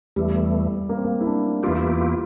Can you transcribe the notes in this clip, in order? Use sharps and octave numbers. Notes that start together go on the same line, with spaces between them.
E2 E3 G3 A3
A#3
C4
A#3
E4
D4
E2 E3 A#3 E4 F4 G4
F4